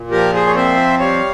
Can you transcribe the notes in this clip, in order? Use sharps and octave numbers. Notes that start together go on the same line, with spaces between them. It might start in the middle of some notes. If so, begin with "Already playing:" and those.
Already playing: A#2
F3 G4 A#4
G#4 C5
C#5
C4 C5 E5
G3 C#5 F5